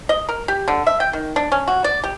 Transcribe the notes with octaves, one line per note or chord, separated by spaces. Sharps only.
D#5
A#4
G4
D3
E5
G5
D#3
D4
C#4
F#4
D5
G4